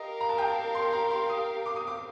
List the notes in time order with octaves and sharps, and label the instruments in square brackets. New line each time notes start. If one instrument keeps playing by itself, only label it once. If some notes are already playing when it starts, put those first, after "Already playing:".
Already playing: [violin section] G4 A#4 F5 [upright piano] D#5
[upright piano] A#5
A5
G5
A5
C6
A#5
C6
D#6
D6
D#6
D6